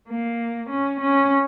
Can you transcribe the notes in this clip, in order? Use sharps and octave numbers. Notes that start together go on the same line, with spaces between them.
A#3
C#4
C#4